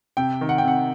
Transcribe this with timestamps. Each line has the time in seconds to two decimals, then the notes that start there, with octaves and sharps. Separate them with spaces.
0.17 C3 G5
0.41 D#3
0.49 F#5
0.58 G5
0.64 C3 F#5